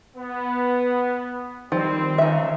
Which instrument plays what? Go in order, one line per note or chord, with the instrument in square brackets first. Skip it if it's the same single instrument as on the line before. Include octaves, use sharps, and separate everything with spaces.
[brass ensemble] B3
[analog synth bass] D#3 [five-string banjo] F3 [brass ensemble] G3 C4
[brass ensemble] C#2 C#3 [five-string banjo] D#4 E5